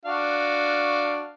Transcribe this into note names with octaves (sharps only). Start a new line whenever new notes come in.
D4 F#4 F5